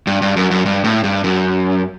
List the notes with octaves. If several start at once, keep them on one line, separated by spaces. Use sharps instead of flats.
G2
G2
F#2
F#2
G2
A2
G2
F#2